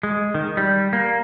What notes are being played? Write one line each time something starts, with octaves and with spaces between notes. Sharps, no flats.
G#3
D#3
G3
A#3